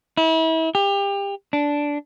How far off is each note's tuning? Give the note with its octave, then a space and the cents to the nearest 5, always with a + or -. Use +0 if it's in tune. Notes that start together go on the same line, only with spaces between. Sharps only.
E4 -35
G4 +30
D4 -10